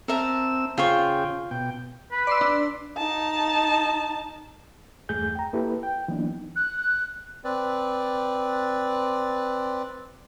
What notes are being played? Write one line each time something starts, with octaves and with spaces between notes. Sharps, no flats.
C4 A#4 E5 A5 E6
C#3 F4 G#4 C5 G5 C#6
B2 G5
B4
D5 C6 E6
D4
D#4 A5
E2 G2 A3 G#4 G6
G5 A#5
A#3 E4 G4 A4 B4
G5
E3 F#3 A#3 B3 D4 D#4
F#6
C4 B4 D5